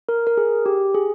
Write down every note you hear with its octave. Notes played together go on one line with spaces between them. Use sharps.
A#4
A#4
G#4
G4
G#4